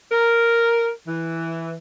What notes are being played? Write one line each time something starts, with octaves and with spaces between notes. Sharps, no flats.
A#4
E3